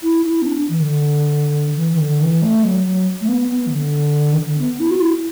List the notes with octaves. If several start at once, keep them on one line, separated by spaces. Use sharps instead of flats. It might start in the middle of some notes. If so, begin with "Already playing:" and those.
E4
E4
B3
D4
E3
D3
E3
E3
D3
E3
A3
F#3
F#3
A3
B3
B3
E3
D3
E3
D3
B3
E4
F#4
E4